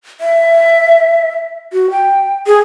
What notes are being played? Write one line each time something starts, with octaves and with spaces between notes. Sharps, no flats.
E5
F#4
G5
G#4